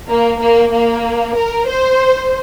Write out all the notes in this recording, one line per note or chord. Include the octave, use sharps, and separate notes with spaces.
A#3
A#3
A#3
A#4
C5